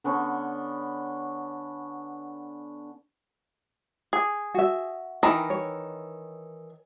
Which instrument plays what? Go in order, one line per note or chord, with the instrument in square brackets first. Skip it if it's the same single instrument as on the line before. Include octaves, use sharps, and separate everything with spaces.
[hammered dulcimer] D3 B3 C#4
[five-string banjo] G#4
[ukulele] F#4 E5
[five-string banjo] D#3 E3 A#5
[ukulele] C#5